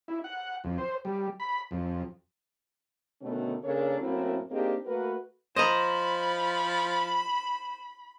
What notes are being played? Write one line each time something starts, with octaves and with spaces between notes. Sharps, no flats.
E4
F#5
F2
C5
G3
B5
F2
B2 D3 D#3 A3 B3 C#4
C#3 A#3 D4 A4 A#4 C#5
F#2 A2 A#3 C4 E4 F#4
A#3 C4 D4 D#4 G4 G#4
A3 A#3 F#4 A#4 B4
F3 C5 D#5 A#5 B5